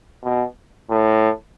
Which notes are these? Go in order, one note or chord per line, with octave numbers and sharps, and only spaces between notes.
B2
A2